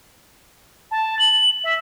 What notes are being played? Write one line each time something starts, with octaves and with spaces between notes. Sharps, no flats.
A5
F#7
E5